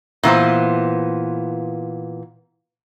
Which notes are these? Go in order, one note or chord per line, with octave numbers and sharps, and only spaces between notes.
A#2 E3 B3 C5